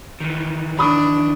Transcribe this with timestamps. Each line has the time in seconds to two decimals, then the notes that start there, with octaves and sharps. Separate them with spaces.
0.20 D#3 E3
0.79 D4 B5 C#6 D#6